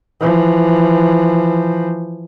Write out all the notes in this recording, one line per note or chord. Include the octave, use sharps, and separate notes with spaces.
E3 F3